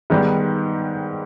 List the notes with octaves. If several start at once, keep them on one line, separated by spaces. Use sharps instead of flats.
G#2 D#3 G3 B3